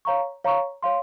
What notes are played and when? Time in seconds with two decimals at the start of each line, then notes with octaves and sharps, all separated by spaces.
0.05 C#5 F5 A#5 C#6
0.44 C#5 F5 A#5 C#6
0.83 C#5 F5 C6